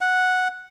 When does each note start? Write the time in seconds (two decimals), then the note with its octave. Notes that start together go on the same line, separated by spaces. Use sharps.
0.01 F#5